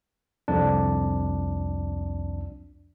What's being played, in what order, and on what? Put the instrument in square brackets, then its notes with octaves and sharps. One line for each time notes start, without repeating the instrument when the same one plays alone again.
[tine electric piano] C2 F2 D4